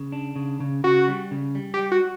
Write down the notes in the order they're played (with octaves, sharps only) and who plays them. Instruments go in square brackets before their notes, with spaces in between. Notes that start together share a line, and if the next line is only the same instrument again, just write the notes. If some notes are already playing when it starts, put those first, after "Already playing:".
Already playing: [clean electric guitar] C#3
D4
C#3
C#3
[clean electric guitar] C#3 [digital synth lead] F#4
[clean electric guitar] G3
C#3
G3
[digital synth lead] G4
[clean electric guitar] G3
[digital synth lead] F#4